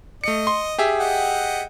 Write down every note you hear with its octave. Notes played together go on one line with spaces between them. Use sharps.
A3 D#5 C#7
C6
G4 G#4 E5
D#5 F#5 G5